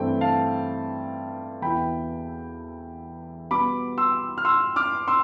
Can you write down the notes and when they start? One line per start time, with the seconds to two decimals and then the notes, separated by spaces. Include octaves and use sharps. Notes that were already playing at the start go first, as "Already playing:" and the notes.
Already playing: G2 E3 A3 C4 G5
0.21 F5 A5
1.62 E2 B2 B3 E4 G5 B5
3.51 B2 G3 B3 B5 D6
3.98 C6 E6
4.38 F6
4.45 C6 E6
4.76 D6 F6
5.08 C6 E6